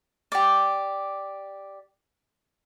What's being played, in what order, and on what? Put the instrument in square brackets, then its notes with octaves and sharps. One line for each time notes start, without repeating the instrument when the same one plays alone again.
[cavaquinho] G4 D5